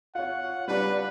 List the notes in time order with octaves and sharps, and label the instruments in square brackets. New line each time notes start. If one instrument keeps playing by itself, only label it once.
[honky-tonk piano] F4 C#5 [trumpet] F#5
[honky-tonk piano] G3 D4 [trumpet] B4